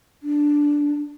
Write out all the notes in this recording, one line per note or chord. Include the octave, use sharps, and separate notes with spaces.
D4